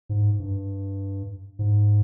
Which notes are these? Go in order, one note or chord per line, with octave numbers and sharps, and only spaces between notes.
G#2
G2
G#2